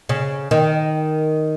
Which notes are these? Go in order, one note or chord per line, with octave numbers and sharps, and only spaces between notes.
C#3
D#3